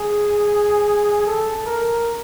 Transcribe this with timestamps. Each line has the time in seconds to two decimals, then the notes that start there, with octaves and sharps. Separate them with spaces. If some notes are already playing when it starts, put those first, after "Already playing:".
Already playing: G#4
1.27 A4
1.66 A#4